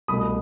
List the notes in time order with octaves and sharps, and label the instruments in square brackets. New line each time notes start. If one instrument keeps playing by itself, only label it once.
[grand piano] C2 B2 A3 B5 D#6